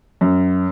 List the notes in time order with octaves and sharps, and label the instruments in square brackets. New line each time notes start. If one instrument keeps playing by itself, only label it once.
[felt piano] F#2